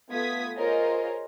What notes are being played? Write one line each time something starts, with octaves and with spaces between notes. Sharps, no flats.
A3 B3 F4 D#6 G#6 B6
F4 G#4 A#4 C5 C#5 D#5